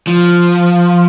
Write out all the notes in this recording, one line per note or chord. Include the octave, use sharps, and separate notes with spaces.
F3